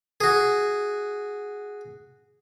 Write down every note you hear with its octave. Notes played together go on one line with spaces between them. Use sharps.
F#4 G#4